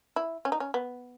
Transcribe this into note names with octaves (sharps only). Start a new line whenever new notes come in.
E4
C#4
D#4
C#4
B3